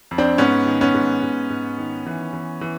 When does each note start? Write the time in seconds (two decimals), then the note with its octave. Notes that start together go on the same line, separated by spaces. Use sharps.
0.11 F2
0.18 C4 D4
0.38 G#2 B3 C#4
0.66 D#3
0.81 B3 C#4
0.94 G#2
1.22 G#2
1.50 G#2
1.78 D#3
2.06 E3
2.33 E3
2.61 E3